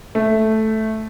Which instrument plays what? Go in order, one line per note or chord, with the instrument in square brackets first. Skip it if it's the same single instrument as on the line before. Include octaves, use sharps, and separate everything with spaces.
[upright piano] A3